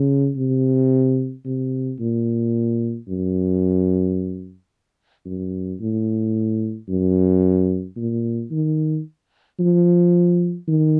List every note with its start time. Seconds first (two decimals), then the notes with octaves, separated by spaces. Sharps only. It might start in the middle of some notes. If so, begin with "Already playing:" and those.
Already playing: C#3
0.37 C3
1.46 C3
2.00 A#2
3.08 F#2
5.26 F#2
5.80 A2
6.89 F#2
7.96 A#2
8.51 D#3
9.59 F3
10.68 D#3